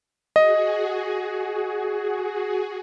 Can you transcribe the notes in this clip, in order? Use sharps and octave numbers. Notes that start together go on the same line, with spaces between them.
F#4 G#4 D#5